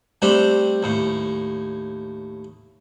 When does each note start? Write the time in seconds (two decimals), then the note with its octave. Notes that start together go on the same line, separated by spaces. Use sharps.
0.22 G3 A3 C4 D4
0.83 D#2 A2